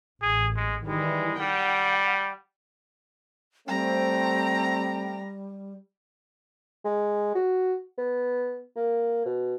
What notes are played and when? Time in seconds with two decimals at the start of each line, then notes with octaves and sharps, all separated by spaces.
0.22 A1 G#4
0.56 G#3
0.86 D#3 E3 G3 G#3
1.39 G3 F#5 G5
3.68 G3 A3 C4 G5 A#5
6.85 G#3
7.35 F#4
7.98 B3
8.76 A#3
9.26 B2